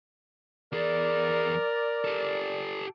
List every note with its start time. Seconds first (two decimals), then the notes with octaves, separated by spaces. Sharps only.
0.72 E2 G#4 A#4 D5
2.04 G4 A4